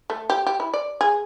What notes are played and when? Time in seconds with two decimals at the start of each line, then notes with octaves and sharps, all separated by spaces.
0.10 A3
0.30 G4
0.47 G4
0.60 E4
0.74 D5
1.01 G#4